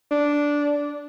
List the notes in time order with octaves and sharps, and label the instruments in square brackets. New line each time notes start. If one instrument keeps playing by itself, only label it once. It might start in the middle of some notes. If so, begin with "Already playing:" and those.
[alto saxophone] D4